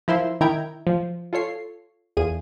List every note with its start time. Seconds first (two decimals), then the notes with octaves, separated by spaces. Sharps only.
0.08 F3 E4 A#4 C6 E6
0.41 D#3 E4 G5 A#5 G#6 D7
0.87 F3
1.33 F4 A4 C#5 C7
2.17 E2 F3 G#4 D#7